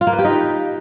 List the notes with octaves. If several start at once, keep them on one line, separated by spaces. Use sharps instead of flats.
F4
A#3
B4
G4
D#4